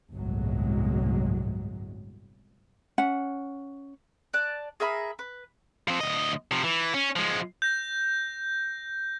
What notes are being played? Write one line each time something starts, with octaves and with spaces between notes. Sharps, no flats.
G1 C2 A2 F#3 G#3
C#4 F#5
D5 A5 F#6
G#4 A#4 E5 B5
B4
F3 C4
D2 D#5
C3 F3
E3
C#4
F3 G#3
G6 A#6